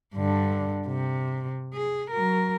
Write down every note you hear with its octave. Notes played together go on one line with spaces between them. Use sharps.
G2 D3
C3
G#4
F#3 A#4